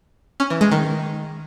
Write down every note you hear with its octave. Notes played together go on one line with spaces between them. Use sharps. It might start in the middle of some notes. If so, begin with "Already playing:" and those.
C#4
E3
G#3
D#3